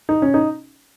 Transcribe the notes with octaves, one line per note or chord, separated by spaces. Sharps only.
D#4
C#4
D#4